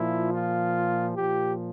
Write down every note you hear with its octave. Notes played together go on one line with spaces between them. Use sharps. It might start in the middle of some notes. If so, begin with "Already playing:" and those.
Already playing: A#2 F3 E4
F4
A#2 F3 G4